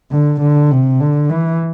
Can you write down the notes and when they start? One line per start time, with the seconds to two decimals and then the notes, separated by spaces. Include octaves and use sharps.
0.11 D3
0.41 D3
0.71 C3
1.01 D3
1.30 E3